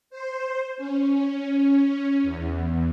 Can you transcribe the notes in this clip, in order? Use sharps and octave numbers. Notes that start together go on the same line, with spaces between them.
C5
C#4
E2